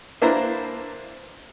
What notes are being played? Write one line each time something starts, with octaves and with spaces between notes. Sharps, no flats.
A#3 D4 E4 B4 C5 A#5